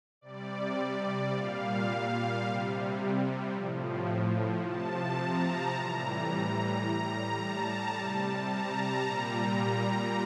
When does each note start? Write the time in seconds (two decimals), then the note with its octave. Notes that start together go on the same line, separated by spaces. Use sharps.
0.21 C3 G3 D5
1.32 A#2 G3 F5
2.42 C3 G3
3.53 A2 F3
4.63 C3 F3 A5
5.19 A#5
5.74 A2 E3 G3
6.85 A2 G3 A#5
7.39 A5
7.95 C3 G3
8.51 A#5
9.06 A#2 G3